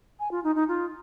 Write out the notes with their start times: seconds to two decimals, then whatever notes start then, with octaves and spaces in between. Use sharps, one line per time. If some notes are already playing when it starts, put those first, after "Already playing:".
0.20 G#5
0.31 F4
0.44 D#4
0.56 D#4
0.68 F4